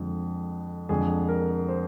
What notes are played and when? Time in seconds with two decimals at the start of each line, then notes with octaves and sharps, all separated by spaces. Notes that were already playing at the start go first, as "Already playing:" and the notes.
Already playing: F2 D3 G#3
0.89 F2 D3 G#3 G#4
1.29 A#4
1.68 C5